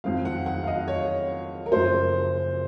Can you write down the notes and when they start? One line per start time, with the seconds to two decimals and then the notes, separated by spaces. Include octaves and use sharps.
0.04 F2 D#3 F#3 C4 F5
0.25 F#5
0.46 F#5
0.63 F5
0.67 D#5
0.88 C#5
1.66 A#4
1.72 F#1 F#2 F3 C5